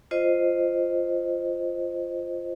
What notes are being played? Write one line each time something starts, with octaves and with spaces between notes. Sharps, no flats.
F4 C5 D#5